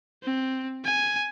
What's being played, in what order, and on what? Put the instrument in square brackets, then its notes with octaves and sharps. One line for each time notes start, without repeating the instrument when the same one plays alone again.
[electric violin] C4
G#5